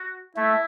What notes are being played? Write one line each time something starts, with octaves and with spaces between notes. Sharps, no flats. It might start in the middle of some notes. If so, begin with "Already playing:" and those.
Already playing: F#4
A3 E4